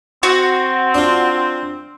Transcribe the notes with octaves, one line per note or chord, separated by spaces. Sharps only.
C4 F#4
D4 F4